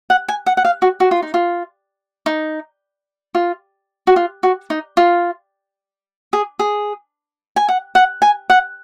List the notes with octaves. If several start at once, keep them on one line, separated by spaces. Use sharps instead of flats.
F#5
G#5
F#5
F#5
F5
F#4
F#4
F4
D#4
F4
D#4
F4
F#4
F4
F#4
D#4
F4
G#4
G#4
G#5
F#5
F#5
G#5
F#5